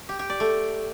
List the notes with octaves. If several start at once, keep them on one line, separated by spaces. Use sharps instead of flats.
G4
G4
D5
A3